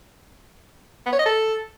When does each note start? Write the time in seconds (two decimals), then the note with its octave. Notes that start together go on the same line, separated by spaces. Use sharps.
1.06 B3
1.12 C#5
1.19 D#5
1.26 A4